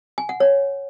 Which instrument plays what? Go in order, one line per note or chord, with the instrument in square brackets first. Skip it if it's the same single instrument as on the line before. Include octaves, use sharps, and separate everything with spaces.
[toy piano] G#5
F#5
C#5